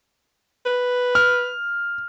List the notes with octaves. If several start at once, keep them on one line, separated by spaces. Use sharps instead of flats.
B4
F6